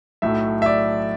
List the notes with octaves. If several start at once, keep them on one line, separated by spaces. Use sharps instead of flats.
B1 A2 F#3 A3 E5
E5
D5